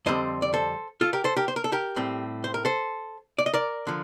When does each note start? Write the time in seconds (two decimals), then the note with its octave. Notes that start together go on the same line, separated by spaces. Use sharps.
0.06 F2 D3 G3 C4 C5 D#5
0.42 D5
0.54 A4 C5
1.01 F4 A4
1.13 G4 A#4
1.24 A4 C5
1.36 G4 A#4
1.48 C5
1.56 A#4
1.64 A4
1.72 G4 A#4
1.96 A2 G3 C4
2.44 C5
2.54 A#4
2.65 A4 C5
3.38 D5
3.46 D#5
3.53 A#4 D5
3.87 D3 F3